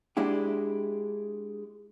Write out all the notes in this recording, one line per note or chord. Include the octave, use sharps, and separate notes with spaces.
G#3 D4 E4 G4